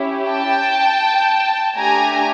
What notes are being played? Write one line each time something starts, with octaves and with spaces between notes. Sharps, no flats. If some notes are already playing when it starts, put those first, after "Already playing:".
Already playing: C#4 E4 G4
G5 A5
A3 D4 G4 G#5 A#5